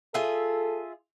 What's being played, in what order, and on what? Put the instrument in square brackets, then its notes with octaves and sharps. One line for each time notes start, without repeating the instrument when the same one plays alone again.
[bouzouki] F4 G#4 E5 [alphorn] A4